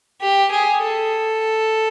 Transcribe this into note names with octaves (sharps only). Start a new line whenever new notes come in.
G4
G#4
A4